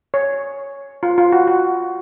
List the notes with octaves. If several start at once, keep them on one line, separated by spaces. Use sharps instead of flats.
C#5
F4
F4
F#4
F#4